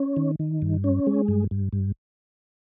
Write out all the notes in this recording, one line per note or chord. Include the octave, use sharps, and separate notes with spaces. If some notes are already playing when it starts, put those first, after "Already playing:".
Already playing: C#4
D#3
D#3
G2
C#4
G#3
G2
G2
G2